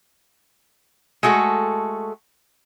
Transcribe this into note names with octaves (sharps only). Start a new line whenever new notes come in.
G#3 A3 F#4 A4